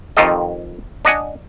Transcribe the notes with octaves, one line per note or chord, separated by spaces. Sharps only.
F2 D#3 F4 G4 A4 D#5
D4 D#5 F#5 G#5